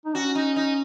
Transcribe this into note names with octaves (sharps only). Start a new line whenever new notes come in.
D#4
C#4 F#4
D#4
D#4